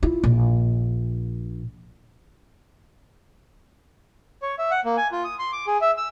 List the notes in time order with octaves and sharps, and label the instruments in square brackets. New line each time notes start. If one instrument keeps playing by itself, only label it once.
[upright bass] E4 F4
A#1
[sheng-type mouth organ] C#5
E5
F#5
A#3
G#5
F4
D#6
C6
D6
G#4
E5
E6